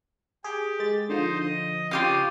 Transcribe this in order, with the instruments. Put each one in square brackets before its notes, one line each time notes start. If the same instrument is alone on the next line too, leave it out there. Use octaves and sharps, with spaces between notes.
[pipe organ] G4 [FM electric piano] G#4
[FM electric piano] G#3 A6
[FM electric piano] D3 F3 [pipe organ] D#4 C5
[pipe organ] D#5
[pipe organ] C#3 D#6 [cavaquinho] F4 G4 F5